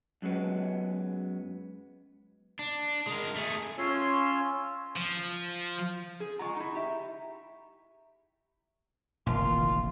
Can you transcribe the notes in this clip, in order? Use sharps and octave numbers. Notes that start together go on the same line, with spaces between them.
F#2 F#3 G#3 B3
D4
G#3 A#4
A3 G#4
C#4 F4 C#5 C6 E6
F3
G#4
G#3 F4 F#5 A#5 C#6
D#4 E4
G4 E5
F1 A#1 D#3 E3 F4